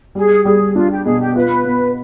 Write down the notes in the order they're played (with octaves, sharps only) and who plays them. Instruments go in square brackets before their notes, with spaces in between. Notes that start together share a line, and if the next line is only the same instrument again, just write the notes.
[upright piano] G3 [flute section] G#4
[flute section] G4
[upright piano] G3 [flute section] G#4
[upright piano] D4 [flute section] F4
[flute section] G4
[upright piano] B2 [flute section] G#4
[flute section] G4
[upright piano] F4 [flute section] B4
[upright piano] B3